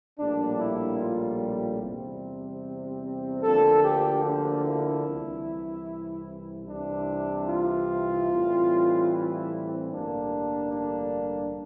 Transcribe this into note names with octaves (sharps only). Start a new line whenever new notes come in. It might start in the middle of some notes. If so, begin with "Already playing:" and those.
A#1 A2 G3 A#3 D4
E4
F4
F4
E2 C3 G3 C4
D2 D3 F3 A#3 A4
G4
D4
E4
C2 C3 E3
C2 C3 E3 D4
F4
A2 E3 G3 C4
E4
C4
A1 G2 D3 G3 A#3 D4
D4